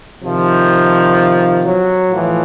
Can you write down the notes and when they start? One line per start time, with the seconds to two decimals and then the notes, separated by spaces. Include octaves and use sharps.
0.22 C3 D#3 F3
1.63 F#3
2.09 A2 E3 F3